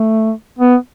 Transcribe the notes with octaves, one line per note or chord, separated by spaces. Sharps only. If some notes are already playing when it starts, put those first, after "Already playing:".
Already playing: A3
B3